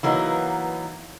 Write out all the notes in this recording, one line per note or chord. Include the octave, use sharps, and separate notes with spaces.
E3 F#3 A#3 B3 D#4